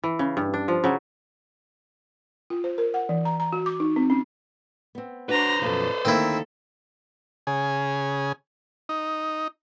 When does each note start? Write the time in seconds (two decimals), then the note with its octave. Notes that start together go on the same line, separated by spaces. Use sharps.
0.04 E3
0.19 C#3
0.37 G2
0.54 D4
0.68 F3
0.84 C#3 F#3
2.50 F4
2.64 C5
2.78 A#4
2.94 F#5
3.09 E3
3.25 A#5
3.40 A#5
3.52 F#4
3.66 D6
3.80 D#4
3.96 C4
4.10 C#4
4.95 B3 C4
5.29 D4 F#4 B4 C5 A#5
5.62 F#2 B2 F3 A4
6.05 D2 D#3 A#3 C4 E4 A4
7.47 C#3 G#4
8.89 D#4